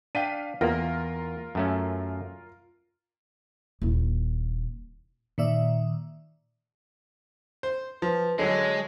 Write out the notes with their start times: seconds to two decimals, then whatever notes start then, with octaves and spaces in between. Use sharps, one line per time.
0.15 D4 F5 G5 B6 D#7
0.61 E2 A#3 F4 A#4 A#6
1.55 F#2 A3 C#4
3.82 D#1 E4
5.38 A#2 D#3 D5 E5
7.63 C5
8.02 F3 B4
8.39 D3 F#3 G#3 C#5